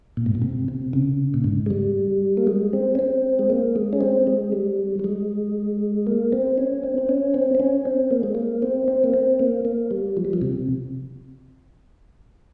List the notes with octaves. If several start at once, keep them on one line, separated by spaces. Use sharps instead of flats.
A#2
G#2
A#2
C3
C3
C#3
A#2
G#2
G#3
G3
A#3
G#3
C4
C#4
C4
G#3
A#3
G#3
C#4
C4
G#3
G3
G3
G#3
A#3
C4
C#4
C4
C4
C#4
C4
C4
C#4
C4
A#3
G#3
A#3
C4
C4
A#3
C4
A#3
A#3
G3
F3
G3
F3
C3